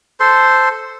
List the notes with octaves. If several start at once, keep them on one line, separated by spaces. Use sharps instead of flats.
A4 C5 C6